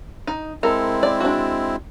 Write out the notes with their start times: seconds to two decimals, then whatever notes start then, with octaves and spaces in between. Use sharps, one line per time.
0.27 D#4
0.63 G#3 C4 E4 A4 A#4
1.03 D5
1.20 D4 F#4